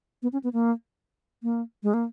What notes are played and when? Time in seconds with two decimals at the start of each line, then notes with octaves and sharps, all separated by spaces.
0.23 B3
0.33 C#4
0.44 B3
0.53 A#3
1.43 A#3
1.83 G#3
1.94 A#3